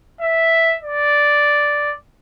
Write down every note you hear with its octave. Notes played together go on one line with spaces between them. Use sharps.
E5
D5